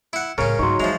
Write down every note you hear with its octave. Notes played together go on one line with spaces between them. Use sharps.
E4 F#5
A2 C#3 G#3 C#4 A#4
G#2 F#3 A3 D#4 C6 C#6
E3 F3 G#3 E5 C#6 F7